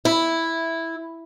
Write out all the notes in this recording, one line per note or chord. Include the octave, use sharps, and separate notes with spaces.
E4